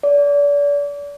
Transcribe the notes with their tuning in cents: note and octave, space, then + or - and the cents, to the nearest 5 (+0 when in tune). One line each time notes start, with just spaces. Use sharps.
D5 -35